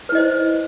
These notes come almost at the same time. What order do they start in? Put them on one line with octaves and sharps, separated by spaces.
B4 E4 D#5 C5